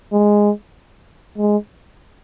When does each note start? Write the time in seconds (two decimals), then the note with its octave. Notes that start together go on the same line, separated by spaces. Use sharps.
0.13 G#3
1.38 G#3